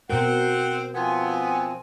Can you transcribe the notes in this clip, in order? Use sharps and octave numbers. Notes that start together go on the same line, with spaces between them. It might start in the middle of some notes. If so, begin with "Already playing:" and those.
B2 C4 A#4 F#5
F3 B3 C4 G#5